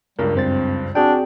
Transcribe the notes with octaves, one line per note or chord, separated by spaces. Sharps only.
C#2 G2 G3 A#4
F#2 C4 C5 A6
C4 D4 F#4 G#4 G5